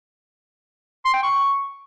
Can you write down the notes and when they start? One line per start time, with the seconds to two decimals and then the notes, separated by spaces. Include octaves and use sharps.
1.05 C6
1.14 G5
1.23 C#6